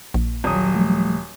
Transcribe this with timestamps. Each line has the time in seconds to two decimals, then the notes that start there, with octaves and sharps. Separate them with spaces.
0.14 A#1
0.44 D#1 F#3 D#6
0.75 F3 G3 A3